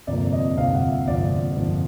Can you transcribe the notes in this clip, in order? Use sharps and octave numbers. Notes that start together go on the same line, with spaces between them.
G1 F2 C3 F3 A#3 D5
D#5
G1 F2 C3 F3 A#3 F5
F#5
E5
G1 F2 C3 F3 A#3 D5
G1 F2 C3 F3 A#3